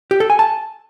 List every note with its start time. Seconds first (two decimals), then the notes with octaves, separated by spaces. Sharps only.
0.11 G4
0.20 A4
0.30 G#5
0.39 A5